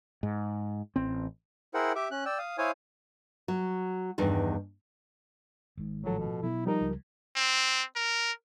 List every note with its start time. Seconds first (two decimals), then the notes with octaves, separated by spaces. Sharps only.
0.23 G#2
0.96 A1 C4
1.74 E4 G#4 A#4 C5 F#5 G5
1.95 G4 E5 D6
2.11 C#4 F#6
2.25 D5 G5 E6
2.38 F5 D#6
2.58 E4 C5 C#5 F5 G#5 D#6
3.48 F#3
4.18 E2 G2 D#3
5.77 G#1 G#2
6.04 A2 F3 F#3 A4
6.18 B2
6.43 B2 F#3 B3 E4
6.66 F3 G3 D#4 A#4
6.81 C#2
7.36 C4
7.96 A#4